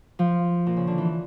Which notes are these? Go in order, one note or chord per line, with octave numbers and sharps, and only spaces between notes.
F3
A#2
C#3
D3
E3